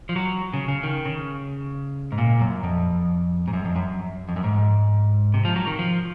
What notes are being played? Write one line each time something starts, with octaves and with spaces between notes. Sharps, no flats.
F3
F#3
C#3
C#3
D#3
C#3
G#2
A#2
F#2
F2
G#2
F#2
F2
F#2
F2
F#2
G#2
C3
F3
F#3
D#3
F3